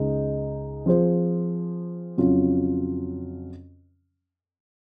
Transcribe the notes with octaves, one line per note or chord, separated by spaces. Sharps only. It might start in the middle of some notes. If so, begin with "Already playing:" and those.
Already playing: C#2 C#3 G#3 D#4
F3 C4 F4 G#4 C5
F2 C#3 F#3 C#4 F4